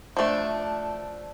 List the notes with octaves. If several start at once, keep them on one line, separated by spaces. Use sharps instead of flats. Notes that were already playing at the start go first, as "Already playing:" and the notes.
F3 A3 D4